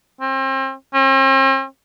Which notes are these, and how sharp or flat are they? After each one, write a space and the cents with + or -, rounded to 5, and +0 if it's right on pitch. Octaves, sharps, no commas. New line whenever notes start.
C4 +35
C4 +45